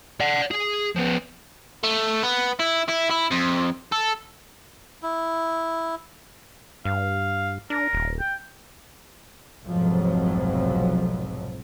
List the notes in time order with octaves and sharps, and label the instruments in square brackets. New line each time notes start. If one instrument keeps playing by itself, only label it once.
[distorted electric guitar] D5 F#5
G#4
F3 B3
[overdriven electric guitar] A3
B3
E4
E4
E4
F2
A4
[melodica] E4
[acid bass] G2 [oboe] F5
[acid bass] D4 [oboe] A#4
[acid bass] D#1
[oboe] G5
[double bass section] F1 B1 F2 G#2 F3 F#3